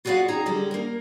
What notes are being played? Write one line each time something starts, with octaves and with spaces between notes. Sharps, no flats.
F4 F#4 G#4 D5 F5 F#5
C4 D#4 G#4 A#5
D3 G3 D5 D#5
A#3 A#4